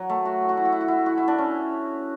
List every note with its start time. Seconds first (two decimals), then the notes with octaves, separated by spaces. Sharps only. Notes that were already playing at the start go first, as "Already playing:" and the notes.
Already playing: F#3
0.10 A3
0.25 F#4
0.42 E4
0.49 F#4
0.57 E4
0.65 F#4
0.72 E4
0.81 F#4
0.88 E4
1.06 F#4
1.17 E4
1.28 D4
1.39 C#4